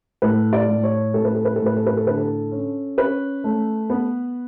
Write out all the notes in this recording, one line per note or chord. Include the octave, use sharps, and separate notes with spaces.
A2 B4
D5
A2
C#5
A2 A4
B4
A4
B4
A2 A4
B4
A4
B4
A4
D3 B4
A4
C#4
C#4 B4
A3
B3